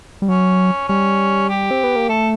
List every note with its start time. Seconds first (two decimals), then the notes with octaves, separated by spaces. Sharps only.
0.22 G3
0.29 F#3 C#4
0.88 G3 C#4
1.49 G4
1.71 C4
1.83 B3
1.96 A#3
2.09 A3 A4